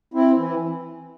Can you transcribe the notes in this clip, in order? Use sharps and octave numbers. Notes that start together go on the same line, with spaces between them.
C4 E4
E3